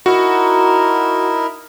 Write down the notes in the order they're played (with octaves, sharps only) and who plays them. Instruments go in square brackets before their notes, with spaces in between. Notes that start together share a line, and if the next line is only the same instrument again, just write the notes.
[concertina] D#4 E4 A#4 [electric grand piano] F#4